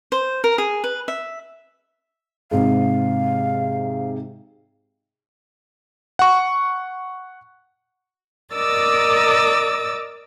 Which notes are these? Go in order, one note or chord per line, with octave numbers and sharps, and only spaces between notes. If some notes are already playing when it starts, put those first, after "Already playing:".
C5
A#4
G#4
B4
E5
G#2 C3 F5
F#5 C#6
A#4 D5 D#5 D6 E6 A6